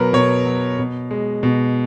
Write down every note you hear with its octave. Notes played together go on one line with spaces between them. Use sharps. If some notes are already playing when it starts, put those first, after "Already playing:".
Already playing: B2 F#3 A#4 B4
B2 C#5
F#3
B2
G#3
B2